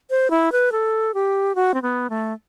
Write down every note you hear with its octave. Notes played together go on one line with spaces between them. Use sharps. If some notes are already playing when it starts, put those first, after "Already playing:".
C5
E4
B4
A4
G4
F#4
C4
B3
A3